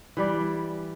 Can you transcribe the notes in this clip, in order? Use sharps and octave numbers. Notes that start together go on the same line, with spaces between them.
E3 G3 D5